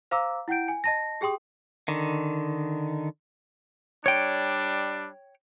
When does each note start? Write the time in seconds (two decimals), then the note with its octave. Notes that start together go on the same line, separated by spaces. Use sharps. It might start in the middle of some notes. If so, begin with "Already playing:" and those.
0.11 C5 F5 A#5 D6 E6
0.48 E4 F#5 G5 G6 D7
0.68 G#5
0.84 D#5 A5 A#6
1.21 G4 G#4 G5 C6 D#6
1.88 D3 D#3
4.06 G3 D4 C#5 G5